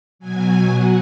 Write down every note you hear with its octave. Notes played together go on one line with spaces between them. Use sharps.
B2 F#3 G#5
F#3 F#5